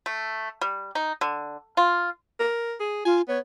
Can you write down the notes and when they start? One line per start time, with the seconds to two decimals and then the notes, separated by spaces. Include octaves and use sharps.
0.06 A3
0.61 G3
0.95 D#4
1.21 D3
1.77 F4
2.40 A#4
2.80 G#4
3.05 F4 G#5
3.28 B3 C#5